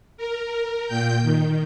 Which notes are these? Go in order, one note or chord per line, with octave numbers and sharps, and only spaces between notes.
A#4
A#2 G5 G6
D#3